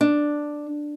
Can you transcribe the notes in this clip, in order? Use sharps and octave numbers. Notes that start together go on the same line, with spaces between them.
D4